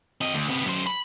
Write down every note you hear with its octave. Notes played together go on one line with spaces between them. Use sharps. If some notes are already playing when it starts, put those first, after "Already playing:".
C4 D#5
D2
C3 B3
F#2 C5
B5